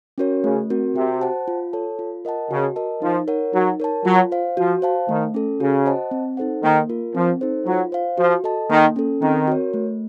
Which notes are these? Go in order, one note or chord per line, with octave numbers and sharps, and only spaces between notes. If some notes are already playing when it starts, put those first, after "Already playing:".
C#4 F#4 A#4 C#5
C#3 A3
C4 F#4 A#4
C3 F#4
C5 F#5 A5
F4
A4 C#5 A5
F4
A#4 D#5 F#5 A5
C#3 F#4
A#4 D#5 A5
F3 D#4
A#4 C#5 F#5
F#3 D#4
A#4 C#5 A5
F#3 F4
C5 F5
F3 F#4
C5 F5 A5
D#3 A3
C#4 A4
C#3 F#4
C5 D#5 F#5 A5
C4
D#4 A4 C5 F#5
D#3 A#3
F4 A#4
F3 C4
D#4 A4 C5
F#3 F4
C5 F5
F3 F#4
A4 D#5 A5
D#3 A#3
C#4 A4
D#3 C4
F#4 A#4 C#5
A3